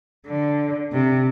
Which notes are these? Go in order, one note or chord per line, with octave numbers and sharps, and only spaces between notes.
D3
C3